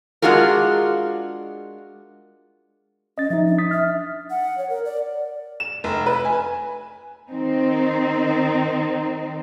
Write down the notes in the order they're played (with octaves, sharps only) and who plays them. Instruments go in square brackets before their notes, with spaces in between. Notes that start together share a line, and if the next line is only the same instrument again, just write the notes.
[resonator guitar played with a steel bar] G#3 D4 F4 F#4 G#4 A#4
[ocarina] C#4 [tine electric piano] D#5 A6
[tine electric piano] F3 D#4 [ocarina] E5
[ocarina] D4
[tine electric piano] D#6 A6 B6
[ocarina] E5 [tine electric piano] F6
[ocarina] F#5
C#5
A#4
D5
[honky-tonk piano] E7
F1
B4
G#5
[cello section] D#3 C4 D#4